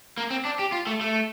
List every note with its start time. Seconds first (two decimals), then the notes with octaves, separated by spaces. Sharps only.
0.17 A#3
0.31 C4
0.45 D4
0.59 G4
0.72 F4
0.87 A3
1.01 A3